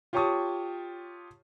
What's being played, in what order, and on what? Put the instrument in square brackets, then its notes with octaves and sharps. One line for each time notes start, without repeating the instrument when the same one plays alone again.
[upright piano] F4 G4 C#5 A5 C#6 D#6